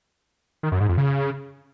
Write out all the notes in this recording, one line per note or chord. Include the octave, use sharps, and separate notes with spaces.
D#3
F#2
G#2
F2
C#3